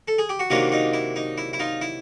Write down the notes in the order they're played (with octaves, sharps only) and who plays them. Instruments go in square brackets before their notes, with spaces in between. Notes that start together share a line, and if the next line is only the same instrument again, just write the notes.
[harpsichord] A4
G#4
G4
F#4
C3 D#3 F#3 A#3 D4 D#4 F4
D#4 F4
E4
D#4
E4
E4
D#4 F4
E4